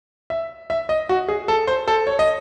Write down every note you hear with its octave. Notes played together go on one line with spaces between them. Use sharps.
E5
E5
D#5
F#4
G#4
A4
C5
A4
C#5
D#5